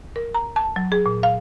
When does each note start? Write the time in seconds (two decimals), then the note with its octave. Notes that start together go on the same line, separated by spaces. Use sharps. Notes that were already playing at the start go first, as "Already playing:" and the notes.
0.16 A#4
0.34 A#5
0.56 A5
0.76 F#3
0.92 G#4
1.06 A#2
1.23 F5